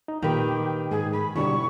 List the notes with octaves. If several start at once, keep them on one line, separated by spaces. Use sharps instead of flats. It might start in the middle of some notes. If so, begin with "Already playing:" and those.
D#4
A#2 D#3 G4 B4
G#2 G#4
B5
B2 D3 G3 E4 C#6